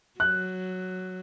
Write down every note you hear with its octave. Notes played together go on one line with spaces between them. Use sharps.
F#3 F#6